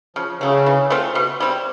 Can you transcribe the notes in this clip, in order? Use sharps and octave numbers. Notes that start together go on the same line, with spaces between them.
C#3 F3
C#3 F#3 A3
E3
A3 C4 F4
B2
G3 C4